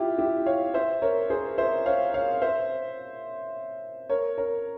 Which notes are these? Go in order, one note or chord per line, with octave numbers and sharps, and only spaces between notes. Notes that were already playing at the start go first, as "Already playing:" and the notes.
Already playing: E4 F4 G4
E4 G4
C#5 F5
C5 E5
A#4 C#5
G#4 C5
C5 E5
C#5 F5
C#5 F5
C5 E5
A#4 C#5
A#4 C#5